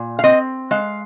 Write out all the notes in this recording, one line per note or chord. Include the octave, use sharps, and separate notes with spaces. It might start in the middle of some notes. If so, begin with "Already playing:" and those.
Already playing: A#2
F5
C4 D#5
G#3 F5